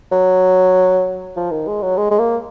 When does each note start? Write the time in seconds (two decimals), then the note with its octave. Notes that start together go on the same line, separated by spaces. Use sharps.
0.12 F#3
1.36 F3
1.51 D#3
1.67 G#3
1.82 F#3
1.97 G#3
2.10 G#3
2.19 A#3